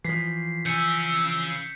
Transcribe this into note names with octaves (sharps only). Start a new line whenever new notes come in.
E3 F3 B6 C7
C#3 G#5 E6 G6 C#7